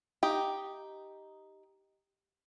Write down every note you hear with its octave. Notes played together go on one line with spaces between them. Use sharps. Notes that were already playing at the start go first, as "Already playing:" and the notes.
D#4 G4